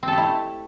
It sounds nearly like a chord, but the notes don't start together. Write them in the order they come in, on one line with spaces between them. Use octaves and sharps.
C4 A4 G4 E4 A3